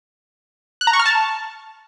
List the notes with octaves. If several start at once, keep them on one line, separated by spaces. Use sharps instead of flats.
F#6
A#5
C#6
F6
A5